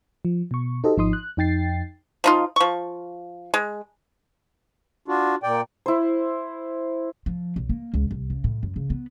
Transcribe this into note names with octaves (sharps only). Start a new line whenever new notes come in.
F3
B2 C#6
D#4 F#4 G4 A4 C5 D#5
G#1 F3 D#4 C6 D#6
F#6
F2 D#4 G5 A6 C7
F3 D#4 F4
F3 C#6
G#3
D4 F4 F#4
A#2 D5 G5
E4 C5
F3
B1
A#3
C#2
C2
C#3
A2
F#2
C#3
B3